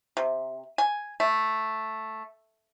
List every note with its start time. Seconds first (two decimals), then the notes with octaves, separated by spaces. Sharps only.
0.17 C3
0.78 G#5
1.20 A3